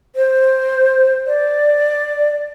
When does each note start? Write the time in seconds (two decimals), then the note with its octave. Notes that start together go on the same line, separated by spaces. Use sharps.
0.16 C5
1.27 D5